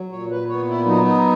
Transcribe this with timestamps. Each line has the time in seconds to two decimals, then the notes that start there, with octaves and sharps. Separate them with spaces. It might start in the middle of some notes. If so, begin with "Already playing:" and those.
Already playing: F#3
0.12 A#2 C#5
0.31 B4
0.49 B3 C#5
0.68 E4
0.86 F#3 D#4
1.05 D#4